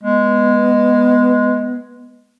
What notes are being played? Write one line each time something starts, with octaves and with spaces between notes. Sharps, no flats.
G#3 B3